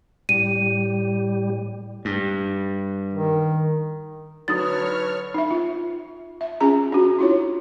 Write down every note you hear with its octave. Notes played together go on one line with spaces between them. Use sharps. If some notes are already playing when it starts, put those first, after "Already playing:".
A2 G3 D#7
G2
D#3
D3 F#3 B4 C#5 D#6 F6 A6
D#4 E5
F4
E5
C#4 F4 G#4 A#5
D4 F#4
E4 F4 C#5